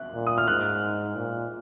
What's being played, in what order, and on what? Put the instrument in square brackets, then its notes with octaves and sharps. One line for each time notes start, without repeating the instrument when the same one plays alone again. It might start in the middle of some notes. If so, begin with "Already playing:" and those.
Already playing: [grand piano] F#6
[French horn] A#2
[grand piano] D#6
F6
[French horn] G#2 [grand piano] F#6
[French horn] A#2